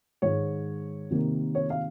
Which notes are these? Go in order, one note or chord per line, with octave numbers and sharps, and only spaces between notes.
G#2 D#3 G#3 C#5
C3 D#3 A#3
C#5
F5